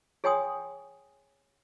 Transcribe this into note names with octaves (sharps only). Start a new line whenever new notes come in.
G#4 C#5 G5 G#5 C6 D#6